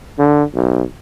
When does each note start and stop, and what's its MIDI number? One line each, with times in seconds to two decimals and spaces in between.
0.19 0.43 50
0.55 0.83 35